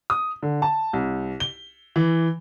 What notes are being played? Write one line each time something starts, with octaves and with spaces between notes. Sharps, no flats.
D#6
D3
A5
C2
G7
E3